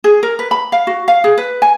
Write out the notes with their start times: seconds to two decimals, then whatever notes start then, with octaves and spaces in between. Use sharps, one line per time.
0.04 G#4
0.23 A#4
0.39 B4
0.51 B5
0.72 F5
0.87 F#4
1.08 F5
1.24 G#4
1.37 B4
1.62 G#5